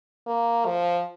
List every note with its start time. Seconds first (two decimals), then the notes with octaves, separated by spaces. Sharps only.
0.27 A#3
0.66 F3